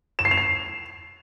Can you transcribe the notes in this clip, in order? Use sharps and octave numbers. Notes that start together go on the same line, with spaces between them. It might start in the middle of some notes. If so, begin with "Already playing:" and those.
E7
C7
F7
C7